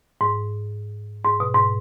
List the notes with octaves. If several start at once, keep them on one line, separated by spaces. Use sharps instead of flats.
G#2
G#2
B2
G#2